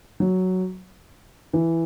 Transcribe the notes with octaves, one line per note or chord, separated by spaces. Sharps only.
F#3
E3